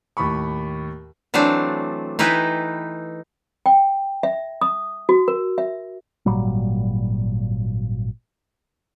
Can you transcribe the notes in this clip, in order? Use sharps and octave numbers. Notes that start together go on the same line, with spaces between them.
D#2 A2 B5 C#6
E3 F#3 A3 C4 D4
E3 D#4 E4 B4 G5
G5
E5
D#6
F#4
A#4
E5
G#1 A#2 F#3 G3